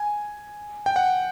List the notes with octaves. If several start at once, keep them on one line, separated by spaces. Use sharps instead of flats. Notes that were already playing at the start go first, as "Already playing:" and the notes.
Already playing: G#5
G5
F#5